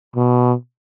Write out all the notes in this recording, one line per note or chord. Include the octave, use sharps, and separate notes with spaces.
B2